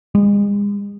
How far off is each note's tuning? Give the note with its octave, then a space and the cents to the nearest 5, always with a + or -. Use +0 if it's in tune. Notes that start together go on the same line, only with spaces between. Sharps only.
G#3 -35